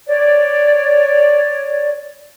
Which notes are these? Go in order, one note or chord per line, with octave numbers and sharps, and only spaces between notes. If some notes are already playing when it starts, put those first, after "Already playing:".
C#5 D5